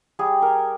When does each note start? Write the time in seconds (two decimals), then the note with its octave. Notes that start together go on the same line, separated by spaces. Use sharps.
0.19 G3 G#4
0.42 A#4